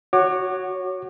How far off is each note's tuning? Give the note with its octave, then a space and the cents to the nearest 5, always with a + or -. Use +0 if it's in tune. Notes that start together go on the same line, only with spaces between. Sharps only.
F#4 +0 C#5 +0 D6 +35